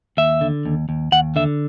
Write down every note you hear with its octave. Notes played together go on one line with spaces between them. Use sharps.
D#2 E5
D3
D#2
D#2
D#2 F#5
D3 E5